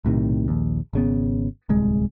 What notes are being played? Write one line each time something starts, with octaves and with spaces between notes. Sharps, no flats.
B1 A2 C3 D#3
A#1 D#2
G#1 C#3 B3
D1 C2 G#3